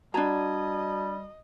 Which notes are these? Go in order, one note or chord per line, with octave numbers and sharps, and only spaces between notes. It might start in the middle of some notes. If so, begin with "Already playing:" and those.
G3 D4 F#4 D#5 A5 A#5 G#6